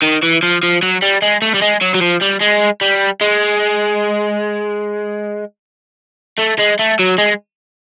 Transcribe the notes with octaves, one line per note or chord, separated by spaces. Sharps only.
D#3
E3
F3
F3
F#3
G3
G#3
A3
G3
G#3
F#3
F#3
F3
G3
G#3
G3
G#3
A3
G#3
A3
F#3
G#3